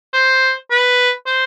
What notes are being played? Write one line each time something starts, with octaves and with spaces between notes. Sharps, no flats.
C5
B4
C5